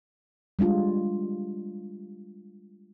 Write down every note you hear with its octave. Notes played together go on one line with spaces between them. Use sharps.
G3 G#3 D4 F4